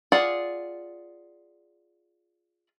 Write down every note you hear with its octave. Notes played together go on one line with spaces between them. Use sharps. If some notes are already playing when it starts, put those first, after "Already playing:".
F4 G#4 D5 F#5